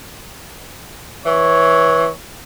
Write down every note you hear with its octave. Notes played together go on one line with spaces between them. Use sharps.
E3 C#5